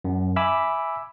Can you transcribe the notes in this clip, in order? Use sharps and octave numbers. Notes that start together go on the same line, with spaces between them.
F#2
E5 G#5 B5 D6 E6